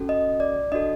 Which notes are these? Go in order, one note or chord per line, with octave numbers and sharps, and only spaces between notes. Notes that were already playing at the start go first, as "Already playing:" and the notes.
Already playing: C#4 F#4 A4
D#5
D5
D4 F#4 A4 D#5